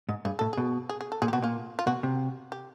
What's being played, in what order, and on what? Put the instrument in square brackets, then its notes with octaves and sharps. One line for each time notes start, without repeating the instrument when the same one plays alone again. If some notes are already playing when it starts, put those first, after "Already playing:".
[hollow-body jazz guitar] G#2
[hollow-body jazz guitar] G2 [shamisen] G#4
[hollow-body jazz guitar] A2 [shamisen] A4
[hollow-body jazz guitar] B2 [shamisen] G#4
[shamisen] G#4
G#4
A4
[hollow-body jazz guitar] A#2 [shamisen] G#4
[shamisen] G4
[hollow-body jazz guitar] B2 [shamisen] F#4
[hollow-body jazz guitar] A#2 [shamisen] F4
[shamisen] F4
[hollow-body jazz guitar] B2 [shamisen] F#4
[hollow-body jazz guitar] C3
[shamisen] G4